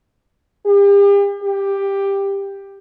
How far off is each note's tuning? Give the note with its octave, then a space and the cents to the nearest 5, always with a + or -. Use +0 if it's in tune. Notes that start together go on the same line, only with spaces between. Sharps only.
G4 +40
G4 +10